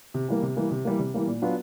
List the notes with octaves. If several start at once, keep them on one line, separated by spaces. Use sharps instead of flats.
C3
E3 G3 A#3
C3
E3 G3 A#3
C3
E3 G3 A#3
C3
E3 G3 A#3
A#2
F#3 B3 D4 F4